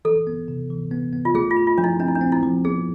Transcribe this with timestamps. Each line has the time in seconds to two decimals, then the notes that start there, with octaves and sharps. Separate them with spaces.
0.05 E3 A4
0.27 B3
0.48 C3
0.70 E3
0.91 B3
1.13 B3
1.25 F4
1.35 A3 G#4
1.51 F4
1.57 G#4
1.67 F4
1.78 F3 D4
1.84 E4
2.00 C4 D4
2.08 E4
2.15 D4
2.21 C4
2.32 E4
2.43 F3
2.65 B3 G#4